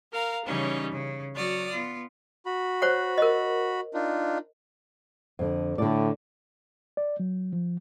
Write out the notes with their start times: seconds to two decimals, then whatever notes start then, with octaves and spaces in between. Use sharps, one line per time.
0.12 A#4 F5 A#5
0.45 C#3 E3 G3 C#4 D#4
0.91 C#3
1.35 F#3 F#4 D5 D#6 F6
1.72 B3 F4
2.46 F#4 B5
2.82 C5 C#5 F#5
3.18 A#4 D#5
3.94 D4 D#4 F4
5.39 F2 D3
5.78 A2 D3 D5
6.97 D5
7.20 F#3
7.53 F3